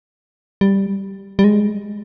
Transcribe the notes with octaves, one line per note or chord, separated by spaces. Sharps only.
G3
G3
G#3